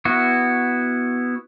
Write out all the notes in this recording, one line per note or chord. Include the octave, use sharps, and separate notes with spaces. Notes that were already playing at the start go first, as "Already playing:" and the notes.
B3 E4 F#4